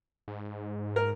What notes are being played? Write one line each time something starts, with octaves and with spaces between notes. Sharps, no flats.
G#2
A#4